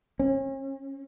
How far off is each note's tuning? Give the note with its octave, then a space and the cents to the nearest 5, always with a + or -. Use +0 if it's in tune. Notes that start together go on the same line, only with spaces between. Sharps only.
C#4 -40